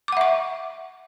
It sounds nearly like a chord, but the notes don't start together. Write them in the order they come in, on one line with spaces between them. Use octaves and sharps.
D6 F#5 E5 C#6